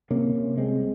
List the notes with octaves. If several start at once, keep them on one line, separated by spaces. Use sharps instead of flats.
C3 A#3 C#4
C3
C2 G#3 C4